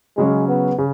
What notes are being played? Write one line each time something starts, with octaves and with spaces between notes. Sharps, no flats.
C#3 F#3 G#3 C#4
B3
C#3